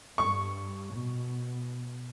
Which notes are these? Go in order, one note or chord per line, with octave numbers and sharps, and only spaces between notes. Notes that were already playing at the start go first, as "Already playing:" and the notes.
G2 C#6
B2